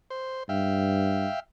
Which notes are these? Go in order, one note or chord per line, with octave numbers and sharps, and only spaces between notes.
C5
G2 E5 F5 G5